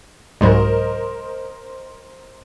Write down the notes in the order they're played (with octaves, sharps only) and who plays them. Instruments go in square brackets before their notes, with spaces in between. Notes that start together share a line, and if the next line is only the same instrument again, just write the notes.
[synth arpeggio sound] C2 G#2 F#3 [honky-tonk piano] A#4 C5 D#5